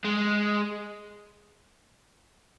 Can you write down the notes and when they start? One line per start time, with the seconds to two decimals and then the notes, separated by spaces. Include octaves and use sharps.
0.04 G#3